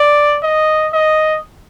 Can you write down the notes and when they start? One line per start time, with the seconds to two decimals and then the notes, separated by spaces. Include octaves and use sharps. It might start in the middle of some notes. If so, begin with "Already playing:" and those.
Already playing: D5
0.43 D#5
0.93 D#5